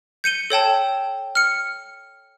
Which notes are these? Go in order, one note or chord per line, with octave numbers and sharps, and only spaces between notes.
G6 C#7 D#7 G7
A4 C#5 G5 A5
F6 C#7